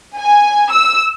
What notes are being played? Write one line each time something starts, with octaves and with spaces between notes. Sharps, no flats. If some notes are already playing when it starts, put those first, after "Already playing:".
G#5
E6